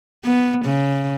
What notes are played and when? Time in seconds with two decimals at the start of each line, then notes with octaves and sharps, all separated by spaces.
0.24 B3
0.65 C#3